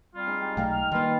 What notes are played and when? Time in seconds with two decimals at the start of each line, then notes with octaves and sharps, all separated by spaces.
0.14 G3 C4 F4
0.27 G#3 D#4
0.41 G4
0.57 B1 G#3 A3 F5 G5 A#5
0.72 F6
0.92 D#3 G3 A#3 D#4 F4 B4